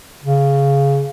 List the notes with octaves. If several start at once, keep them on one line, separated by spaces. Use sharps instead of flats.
C#3